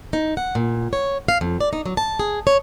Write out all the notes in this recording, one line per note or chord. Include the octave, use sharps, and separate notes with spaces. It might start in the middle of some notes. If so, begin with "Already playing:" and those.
D#4
F#5
A#2
C#5
F5
F2
D5
D#4
F#3
A5
G#4
C#5